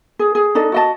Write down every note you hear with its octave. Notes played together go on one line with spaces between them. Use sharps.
G#4
G#4
D4 D#4 A4 D#5
F#4 D#5 A5